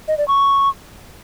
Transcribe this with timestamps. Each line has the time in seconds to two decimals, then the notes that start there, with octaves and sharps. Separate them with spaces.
0.08 D#5
0.18 D5
0.28 C#6